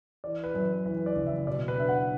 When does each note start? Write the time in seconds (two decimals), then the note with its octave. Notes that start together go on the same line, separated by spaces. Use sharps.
0.24 E3 D5
0.44 B4
0.54 F#2
0.86 E3 B4
1.06 D5
1.16 F#1
1.27 E5
1.47 B2 D5
1.68 B4
1.78 D4 E5
1.89 F#5